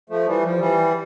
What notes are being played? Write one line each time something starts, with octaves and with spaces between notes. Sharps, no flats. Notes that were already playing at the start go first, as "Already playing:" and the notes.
F3 A3
E3 G3
F3
E3 G3